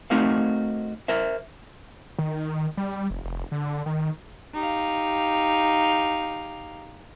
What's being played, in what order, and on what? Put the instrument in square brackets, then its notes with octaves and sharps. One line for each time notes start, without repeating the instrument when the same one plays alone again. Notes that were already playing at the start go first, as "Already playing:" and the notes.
[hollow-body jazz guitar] A3 C4 D#4 F#4 A#4 F5
A#4 C5 E5
[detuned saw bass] D#3
G3
F1
F1
D3
D#3
[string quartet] D#4 G4 F5